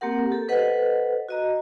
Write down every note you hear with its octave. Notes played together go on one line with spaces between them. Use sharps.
A#3 C4 G4 A#4 F#5
G4 A4
A4 B4 C5 D#5 F#5
F#4 D#5 A#5